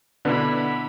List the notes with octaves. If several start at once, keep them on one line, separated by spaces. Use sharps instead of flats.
B2 D3 B3 D4 E4 B5